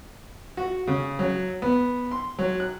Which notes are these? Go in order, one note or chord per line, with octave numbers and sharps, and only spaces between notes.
F#4
C#3
F#3
B3
C6
F#3
F#6